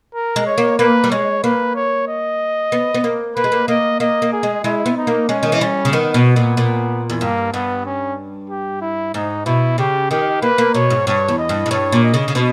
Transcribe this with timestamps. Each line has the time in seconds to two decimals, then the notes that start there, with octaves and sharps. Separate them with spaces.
0.15 A#4
0.36 G#3
0.47 C#5
0.58 A#3
0.79 A#3 B4
1.04 G3
1.11 G#3 C#5
1.43 A#3 B4
1.75 C#5
2.08 D#5
2.72 B3
2.94 B3
3.04 A#3
3.36 A#3 B4
3.44 G#3
3.52 A#3
3.68 A#3 D#5
4.00 A#3 D#5
4.22 A#3
4.33 G#4
4.43 G#3
4.64 G#3 E4
4.86 B3
4.97 D#4
5.07 A#3
5.29 G#3 C#4
5.43 D#3
5.52 E3
5.61 G3 C#4
5.85 C#3
5.93 D#3 B3
6.14 B2
6.36 A#2
6.57 A#2
7.10 E2
7.21 G2 A#3
7.53 G2 B3
7.86 C#4
8.50 G4
8.81 E4
9.14 G#2 D#4
9.46 B2 E4
9.78 C#3 G4
10.11 D#3 G4
10.42 A#3 B4
10.58 A#3
10.74 B2 C#5
10.90 G#2
11.07 G2 C#5
11.28 E2
11.39 D#5
11.49 G2
11.66 G#2
11.71 G2 C#5
11.92 A#2
12.04 D#5
12.14 C#3
12.28 C#3
12.35 B2